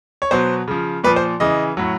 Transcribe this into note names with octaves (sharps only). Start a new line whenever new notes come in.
C#5
B2 F#3 C5
C#3 F3
A#2 F3 B4
C5
C#3 E3 D#5
A2 F#3